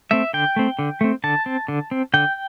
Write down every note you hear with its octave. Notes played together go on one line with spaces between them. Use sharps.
A3 C4 E5
D3 G5
A3 C4
D3
A3 C4
D3 A5
C4
D3
C4
D3 G5